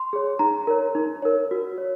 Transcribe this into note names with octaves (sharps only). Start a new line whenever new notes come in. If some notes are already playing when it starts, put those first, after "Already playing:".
Already playing: C6
G#4 C#5
D#4 A#5
A#4 C#5
D#4
A#4 C#5
F#4
C#5